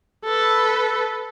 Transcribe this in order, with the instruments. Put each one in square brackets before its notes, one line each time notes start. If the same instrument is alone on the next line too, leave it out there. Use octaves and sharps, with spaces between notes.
[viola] A4 B4